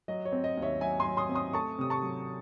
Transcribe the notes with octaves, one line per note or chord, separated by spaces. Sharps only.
F#3 D#5
C#5
C4
D#5
D#2
C#5 E5
F#3 E5 G#5
G#5 C6
F#3
C6 D#6
C4
C6 D#6
A3 A5 C#6
C3 D#6
A5 C#6
F#3